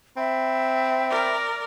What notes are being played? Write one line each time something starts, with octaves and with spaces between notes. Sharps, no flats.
C4 E5 B5
A#4 D5